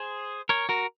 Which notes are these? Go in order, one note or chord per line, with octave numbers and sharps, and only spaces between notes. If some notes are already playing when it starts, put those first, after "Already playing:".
Already playing: G#4 C5
A#4 C#5
F#4 A#4